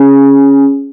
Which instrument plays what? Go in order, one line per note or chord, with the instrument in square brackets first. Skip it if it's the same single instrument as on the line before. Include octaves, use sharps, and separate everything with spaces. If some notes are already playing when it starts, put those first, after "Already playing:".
Already playing: [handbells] C#4 G#4